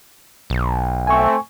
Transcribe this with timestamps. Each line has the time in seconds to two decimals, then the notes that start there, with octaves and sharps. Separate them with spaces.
0.50 B1
1.07 A3 C4 G#5 C#6